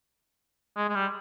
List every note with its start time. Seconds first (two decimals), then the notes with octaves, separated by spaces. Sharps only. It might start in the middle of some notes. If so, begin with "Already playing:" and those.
0.77 G#3
0.89 G#3
0.95 G3